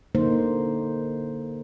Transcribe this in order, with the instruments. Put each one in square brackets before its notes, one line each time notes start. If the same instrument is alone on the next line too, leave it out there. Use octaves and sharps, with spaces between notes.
[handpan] D3 A#3 D#4 C5